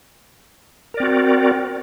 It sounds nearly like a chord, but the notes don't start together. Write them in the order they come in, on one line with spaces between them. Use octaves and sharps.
A#4 D5 C4 F#4